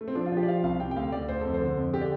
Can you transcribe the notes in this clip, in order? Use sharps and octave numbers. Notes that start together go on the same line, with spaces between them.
A3
C4
F3 D4
F4
F3
G4
D5
F3 F5
C2 F5
C3 G5
G5
D2 F5
D2 D5
D2 C5
F2 A4
C5
D3
F2
D3 G4
D5